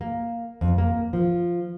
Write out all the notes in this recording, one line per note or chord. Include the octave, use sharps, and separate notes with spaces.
A#3
F2
A#3
F3